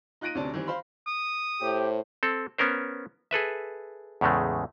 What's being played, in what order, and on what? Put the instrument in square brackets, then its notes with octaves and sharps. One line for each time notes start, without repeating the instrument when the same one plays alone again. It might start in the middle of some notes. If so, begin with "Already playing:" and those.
[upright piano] D#4 F4 F#6 A#6 D7 D#7
D2 C3 C#4 D4 A5
D#3 E3 G3 C4
C5 F5 B5 C6
[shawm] D#6
[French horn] A2 [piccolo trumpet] G4 [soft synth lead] C5
[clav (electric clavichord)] C4 A4
B3 C#4 A#4 C5
G#4 A4 B4 E5
E2 A2 C#3 G#3 A3